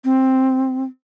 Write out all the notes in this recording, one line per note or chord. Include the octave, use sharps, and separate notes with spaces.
C4